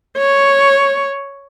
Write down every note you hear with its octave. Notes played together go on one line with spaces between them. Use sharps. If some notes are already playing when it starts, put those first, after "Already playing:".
C#5